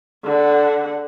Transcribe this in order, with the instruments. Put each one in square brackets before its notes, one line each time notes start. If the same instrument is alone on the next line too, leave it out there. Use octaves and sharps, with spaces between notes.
[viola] D3 F#5